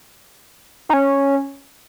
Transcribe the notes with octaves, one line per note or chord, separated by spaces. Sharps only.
D#4
C#4